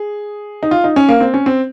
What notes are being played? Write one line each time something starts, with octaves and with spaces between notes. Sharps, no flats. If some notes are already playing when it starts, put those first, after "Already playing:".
Already playing: G#4
D#4
F4
D#4
C#4
A#3
C4
C#4
C4